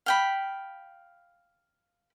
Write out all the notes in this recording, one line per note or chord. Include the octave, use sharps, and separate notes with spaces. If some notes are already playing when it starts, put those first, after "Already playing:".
F5 G5 B5